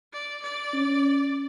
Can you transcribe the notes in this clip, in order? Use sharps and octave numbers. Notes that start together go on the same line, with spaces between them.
D5
D5
C#4